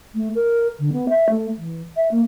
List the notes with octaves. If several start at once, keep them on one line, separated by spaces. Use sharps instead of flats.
A3
A#4
D3
B3
E5
A3
E3
E5
A#3